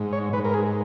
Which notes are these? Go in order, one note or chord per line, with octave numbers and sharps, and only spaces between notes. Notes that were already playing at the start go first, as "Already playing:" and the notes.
Already playing: G#2
C#5
G#2 B4
A#4
G#4